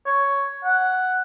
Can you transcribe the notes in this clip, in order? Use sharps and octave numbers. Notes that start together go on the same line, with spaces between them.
C#5
F#5